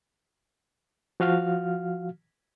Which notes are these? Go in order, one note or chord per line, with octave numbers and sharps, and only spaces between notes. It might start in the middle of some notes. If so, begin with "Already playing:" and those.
F3 F#4 F5 F6